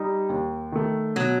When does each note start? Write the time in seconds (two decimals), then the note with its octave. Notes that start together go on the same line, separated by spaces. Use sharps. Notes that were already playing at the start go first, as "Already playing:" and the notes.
Already playing: G3 D#4
0.29 D#2
0.72 D#3 A3
1.16 B2 F#3